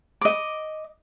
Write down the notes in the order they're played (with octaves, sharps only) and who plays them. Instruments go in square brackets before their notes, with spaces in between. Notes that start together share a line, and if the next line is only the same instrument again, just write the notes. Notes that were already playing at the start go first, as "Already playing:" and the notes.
[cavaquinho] D#5 D6